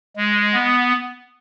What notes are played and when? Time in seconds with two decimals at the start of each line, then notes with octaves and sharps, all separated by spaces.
0.17 G#3
0.54 B3